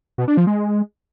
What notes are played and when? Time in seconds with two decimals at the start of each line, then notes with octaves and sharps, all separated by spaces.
0.18 B2
0.28 D4
0.37 F3
0.47 G#3